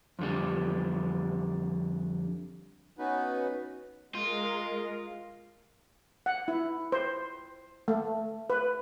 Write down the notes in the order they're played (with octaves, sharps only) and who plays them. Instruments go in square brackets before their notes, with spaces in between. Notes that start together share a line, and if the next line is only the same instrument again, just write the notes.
[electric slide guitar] F2 D3 G3
[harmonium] B3 C#4 D#4 F#4 B4
[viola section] G#3 A#4 [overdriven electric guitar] F4
[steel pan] F#5
E4
C5
A3
B4